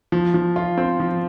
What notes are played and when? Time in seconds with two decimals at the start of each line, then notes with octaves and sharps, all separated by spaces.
0.12 F3
0.34 F3
0.56 F4
0.77 C4
1.00 F3